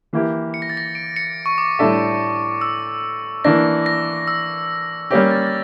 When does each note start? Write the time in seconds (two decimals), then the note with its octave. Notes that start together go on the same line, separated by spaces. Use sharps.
0.13 E3 A#3 E4 G4
0.54 C#7
0.62 A#6
0.70 A6
0.77 A#6
0.95 D7
1.16 C#7
1.46 C#6
1.58 D6
1.79 A2 G3 D4 A4 E5
2.61 E6
3.45 E3 A#3 D4 A#6
3.86 A#6
4.28 E6
5.11 G3 A#3 C#4 G4 A#6
5.31 A6
5.47 A6